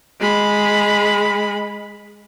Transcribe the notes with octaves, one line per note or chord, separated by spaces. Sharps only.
G#3 B5